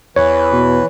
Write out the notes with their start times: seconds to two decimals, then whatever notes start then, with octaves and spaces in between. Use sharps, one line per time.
0.16 E2 E3 B4 C#5
0.52 B2